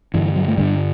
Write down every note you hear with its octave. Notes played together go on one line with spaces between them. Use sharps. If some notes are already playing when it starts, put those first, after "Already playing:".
G2 D3 E3
F#3
A3
G2 D3 G3